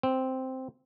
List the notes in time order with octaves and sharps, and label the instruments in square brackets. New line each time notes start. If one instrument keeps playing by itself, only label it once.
[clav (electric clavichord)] C4